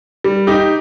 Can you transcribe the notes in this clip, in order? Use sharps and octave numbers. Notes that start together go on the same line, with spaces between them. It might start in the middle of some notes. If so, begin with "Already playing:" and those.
G3
D#4 G4